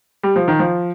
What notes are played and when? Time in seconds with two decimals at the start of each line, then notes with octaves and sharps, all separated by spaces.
0.23 G3
0.36 F3
0.48 D#3
0.59 F3